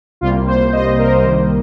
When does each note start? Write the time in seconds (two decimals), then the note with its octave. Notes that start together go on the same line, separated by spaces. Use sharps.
0.21 C2 C3 G3 A#3 F4
0.47 C5
0.72 D#5
0.99 A#4
1.24 C2 C3 D#3 G3 A#3 C5